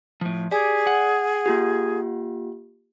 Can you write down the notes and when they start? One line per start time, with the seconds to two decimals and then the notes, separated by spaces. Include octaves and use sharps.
0.21 A2 F3
0.51 G4 G#4 D5 G#5
0.87 F#5
1.46 A#3 F4 G4